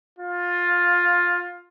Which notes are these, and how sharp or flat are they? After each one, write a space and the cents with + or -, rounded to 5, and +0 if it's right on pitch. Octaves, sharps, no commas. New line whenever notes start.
F4 +15